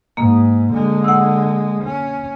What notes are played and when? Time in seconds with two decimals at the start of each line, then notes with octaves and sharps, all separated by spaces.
0.17 G#2 A#3
0.72 D3 G#3
1.04 F#5 E6
1.84 C#4